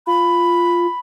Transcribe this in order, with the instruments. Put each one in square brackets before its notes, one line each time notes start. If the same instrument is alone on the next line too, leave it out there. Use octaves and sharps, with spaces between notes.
[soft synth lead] F4 [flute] B5